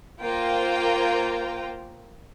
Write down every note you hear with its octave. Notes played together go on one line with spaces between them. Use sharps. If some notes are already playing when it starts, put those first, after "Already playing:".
A#3 F4 A#4 C5 G5 A#5